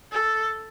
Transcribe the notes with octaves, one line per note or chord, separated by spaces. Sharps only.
A4